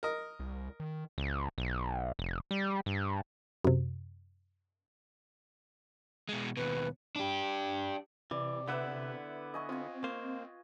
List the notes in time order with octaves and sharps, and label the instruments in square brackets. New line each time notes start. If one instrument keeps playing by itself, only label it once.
[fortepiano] A#4 D#5
[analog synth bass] C2
D#3
[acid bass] C#2
B1
F1
G3
G2
[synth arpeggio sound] F#2 C3
[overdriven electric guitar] B2 G#3
[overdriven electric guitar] D#2 B2 [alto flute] B4
[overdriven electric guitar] D4 G4
[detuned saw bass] C3 [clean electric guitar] E3 [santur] D5
[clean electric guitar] D3 B3 E4 [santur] B4 E5 F#5
[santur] D#5 G#5 C#6
[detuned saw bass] C4 [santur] F4 G#5
[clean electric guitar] A#3 C5